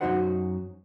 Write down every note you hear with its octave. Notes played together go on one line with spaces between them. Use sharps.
F#2 D4 D#4 F#4 C5 F#5